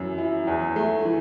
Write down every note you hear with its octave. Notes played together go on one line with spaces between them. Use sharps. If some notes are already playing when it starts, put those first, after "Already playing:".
Already playing: F#2 E3
E4
E2
A3
E3